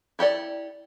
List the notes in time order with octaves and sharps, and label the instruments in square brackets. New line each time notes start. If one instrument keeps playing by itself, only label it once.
[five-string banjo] E4 G4 A4 D5